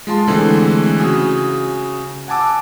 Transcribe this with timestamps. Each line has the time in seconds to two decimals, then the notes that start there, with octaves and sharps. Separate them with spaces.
0.07 G#3 F4 A5 C6
0.27 D3 E3 G#3 A3 C4
1.00 C#3 F#4 G#5 D#6
2.28 F#5 G#5 A5 D6 E6